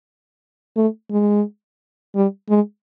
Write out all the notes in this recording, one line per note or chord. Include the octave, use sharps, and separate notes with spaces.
A3
G#3
G3
G#3